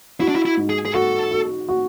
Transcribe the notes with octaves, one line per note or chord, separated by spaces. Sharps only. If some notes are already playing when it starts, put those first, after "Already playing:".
E4 F#4
D4
E4
E4
G#2
G#4
G#4
F#4 A4
F#4
F#4